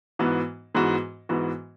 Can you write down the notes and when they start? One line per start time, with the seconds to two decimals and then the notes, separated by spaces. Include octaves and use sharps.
0.19 G#2 E3 B3 F#4
0.75 G#2 E3 B3 F#4
1.29 G#2 E3 B3 F#4